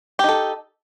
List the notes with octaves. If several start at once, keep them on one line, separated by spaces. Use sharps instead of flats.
D#4 G4 A4